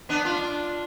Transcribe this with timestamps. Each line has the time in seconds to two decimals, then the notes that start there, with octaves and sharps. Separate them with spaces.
0.09 B3 D4
0.25 D4 F4